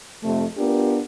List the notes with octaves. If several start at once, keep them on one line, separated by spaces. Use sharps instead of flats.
F2 C3 A3
B3 D4 F4 G4 A#4